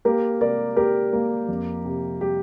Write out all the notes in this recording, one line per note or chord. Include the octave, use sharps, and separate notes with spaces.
A#3 G4 A#4
C3 A#4 D5
A#3 G4 A#4
A#3
F2
C3
G3 G4